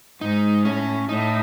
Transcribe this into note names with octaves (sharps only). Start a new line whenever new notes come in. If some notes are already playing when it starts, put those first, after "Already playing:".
G#2 D#4
A2 C#4
A2 D#4